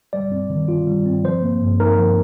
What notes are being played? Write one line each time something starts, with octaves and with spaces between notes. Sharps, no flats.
G3 D5
C4
D#3
F4
G3
C4
F3 C5
A#3
G2
D#4 A#4
F3